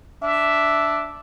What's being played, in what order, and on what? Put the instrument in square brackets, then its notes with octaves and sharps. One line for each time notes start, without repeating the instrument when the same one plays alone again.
[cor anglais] D4 [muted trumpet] E5